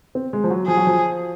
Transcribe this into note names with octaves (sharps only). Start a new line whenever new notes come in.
C4
G#3
F3
F#3
F3 G#4
F#3
F3